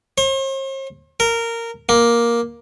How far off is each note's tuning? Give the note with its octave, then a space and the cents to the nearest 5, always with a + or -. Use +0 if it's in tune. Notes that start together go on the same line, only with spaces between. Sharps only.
C5 +45
A#4 -15
A#3 +10